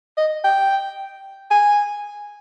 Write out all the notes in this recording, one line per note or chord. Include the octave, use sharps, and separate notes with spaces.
D#5
G5
G#5